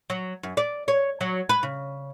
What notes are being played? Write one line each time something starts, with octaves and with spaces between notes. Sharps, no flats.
F#3
F#2
D5
C#5
F#3
B4
C#3